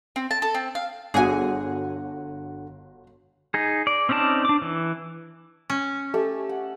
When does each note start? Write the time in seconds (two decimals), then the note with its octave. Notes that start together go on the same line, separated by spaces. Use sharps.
0.16 C4
0.31 A5
0.42 A4
0.54 C4
0.75 F5
1.14 G1 D3 F#4 G#4 F#5 G#5
3.54 D#4 G#4
3.87 D5
4.09 C4 C#4 D#4 D5 A5
4.45 D4 D6
4.62 E3
5.70 C#4
6.14 A3 G4 A4
6.49 F#5